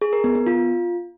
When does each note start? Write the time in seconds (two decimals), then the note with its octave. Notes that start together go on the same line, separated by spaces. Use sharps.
0.02 G#4
0.13 A#4
0.24 B3
0.35 B3
0.46 F4